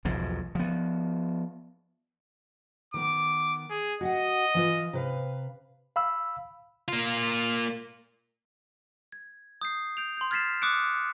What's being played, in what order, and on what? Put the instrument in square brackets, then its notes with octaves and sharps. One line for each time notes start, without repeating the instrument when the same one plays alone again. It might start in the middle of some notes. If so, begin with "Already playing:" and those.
[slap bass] B1 E2 G#2 F3
F3 B3
[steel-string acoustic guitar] D#3 B3 [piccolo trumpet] D6
[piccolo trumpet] G#4
[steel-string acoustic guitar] F#4 E5 F#5 [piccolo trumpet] D#5
[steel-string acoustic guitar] E3 F4 B4
C3 B4 F5
[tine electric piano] F5 B5 E6
[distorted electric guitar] A#3 F4
[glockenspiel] G#6
D#6 G6 C7
G6 D7 F7
C6 G6
F6 G#6 A6 B6 C7 E7
D6 D#6 F#6 C#7 D7